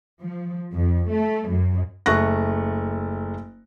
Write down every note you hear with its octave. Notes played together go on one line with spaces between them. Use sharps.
F3
F2
A3
F#2
F#1 A3 C#6 F#6 A#6